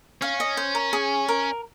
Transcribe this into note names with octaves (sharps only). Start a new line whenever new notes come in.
C#4 F5
D#5
C5
A#4
G#4
A#4